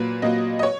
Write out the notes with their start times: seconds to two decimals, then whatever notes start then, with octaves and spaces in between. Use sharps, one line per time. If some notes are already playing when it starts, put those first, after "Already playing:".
Already playing: A#2 F#3 A#3 B4
0.22 A#2 F#3 A#3 D#5
0.59 D#5
0.63 C#5